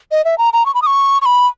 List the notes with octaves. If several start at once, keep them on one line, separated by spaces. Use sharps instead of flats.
D#5
E5
A#5
A#5
C#6
B5
D#6
C#6
C#6
B5